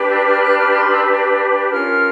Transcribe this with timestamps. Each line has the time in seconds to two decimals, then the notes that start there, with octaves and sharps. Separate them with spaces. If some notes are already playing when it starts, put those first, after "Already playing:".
Already playing: D4 G4 B4
0.09 E6
0.25 F6
0.42 F#6
0.58 F6
0.69 B5
0.73 C6
0.90 E6
1.71 C#4 F4 A#4 F6